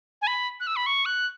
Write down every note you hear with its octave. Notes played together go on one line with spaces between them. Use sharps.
G#5
B5
F#6
E6
B5
C#6
F#6